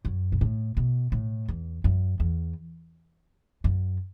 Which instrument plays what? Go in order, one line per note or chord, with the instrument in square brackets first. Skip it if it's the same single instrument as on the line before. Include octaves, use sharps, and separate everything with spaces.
[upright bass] F#2
B2
A2
B2
A2
E2
F#2
E2
F#2